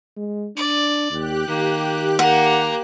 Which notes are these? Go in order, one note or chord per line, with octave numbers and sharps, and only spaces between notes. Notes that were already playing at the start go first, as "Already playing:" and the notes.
G#3
D4 D5
D#2 G4 F#6
D#3 A#3
A#3 A#4 F#5